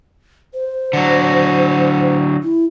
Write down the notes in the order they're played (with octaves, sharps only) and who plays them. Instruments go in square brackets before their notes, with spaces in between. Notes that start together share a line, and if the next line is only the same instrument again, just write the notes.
[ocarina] C5
[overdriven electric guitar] D3 F#3
[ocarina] E4